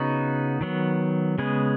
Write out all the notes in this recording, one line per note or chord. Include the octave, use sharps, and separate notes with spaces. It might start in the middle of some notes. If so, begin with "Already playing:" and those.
Already playing: C#3 B3 D#4 F#4
D#3 F#3 B3
C#3 G#3 B3 G#4